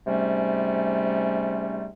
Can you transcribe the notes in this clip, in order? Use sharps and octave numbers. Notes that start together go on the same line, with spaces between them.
G#2 C3 G3 A3 C#4